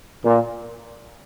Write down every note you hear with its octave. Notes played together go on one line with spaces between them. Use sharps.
A#2